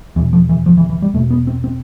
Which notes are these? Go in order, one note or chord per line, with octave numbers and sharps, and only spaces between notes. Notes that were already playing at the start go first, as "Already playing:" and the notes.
E2 B2 E3
F3
E3
F3
E3
E3
G3
E2 B2 A3
B3
C4
C4